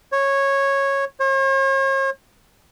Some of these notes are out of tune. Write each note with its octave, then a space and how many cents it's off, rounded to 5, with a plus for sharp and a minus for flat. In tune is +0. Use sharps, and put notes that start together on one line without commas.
C#5 -10
C#5 -45